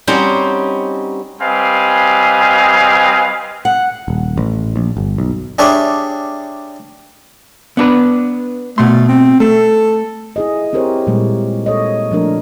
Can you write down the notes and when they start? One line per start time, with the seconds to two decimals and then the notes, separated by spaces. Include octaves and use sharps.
0.07 G3 C4 C#4 D#4 F#4 C5
1.40 G3 C4 B4 D#5 F5 G#5
3.65 F#5
4.08 D#1
4.38 A1
4.76 A#1
4.97 G1
5.18 B1
5.59 G3 D4 G#4 C#5 E5
7.77 B3 D4 B4
8.78 B2 A3 C6
9.09 C4
9.40 A3 A4
10.36 E4 G#4 D#5
10.73 C4 E4 G4 A#4 C5 C#5
11.07 A#2 G3 G#3 A#3 E4
11.66 A4 C#5 D#5
12.12 F3 A3 D4 A#4